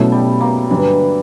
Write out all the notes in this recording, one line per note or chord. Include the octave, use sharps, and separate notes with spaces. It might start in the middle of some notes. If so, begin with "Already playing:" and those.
Already playing: B2 F#3 A3 C#4 E4
G3
A#3
G2 D3 E3 F#3